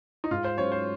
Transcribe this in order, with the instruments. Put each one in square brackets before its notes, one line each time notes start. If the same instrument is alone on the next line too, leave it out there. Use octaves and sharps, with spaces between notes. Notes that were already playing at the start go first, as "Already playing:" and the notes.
[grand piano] D#4
[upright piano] G#2 [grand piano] F4
[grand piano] C5
[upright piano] F#3 C#4 F4 C5 [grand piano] C#5
[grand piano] C5